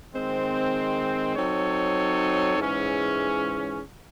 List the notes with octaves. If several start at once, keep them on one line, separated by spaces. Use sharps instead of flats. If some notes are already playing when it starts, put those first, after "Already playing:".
D#3 G#3 C4
F#3 C4 D#4 A4 C#5
G#2 E3 G#3 C#4 G#4